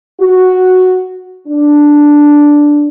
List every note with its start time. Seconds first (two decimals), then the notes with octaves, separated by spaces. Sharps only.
0.20 F#4
1.47 D4